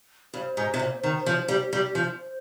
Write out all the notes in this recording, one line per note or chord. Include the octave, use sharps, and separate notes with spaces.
G2 C5
G#2
C3
A#2
D#3
F3
G3
G3
F3
C5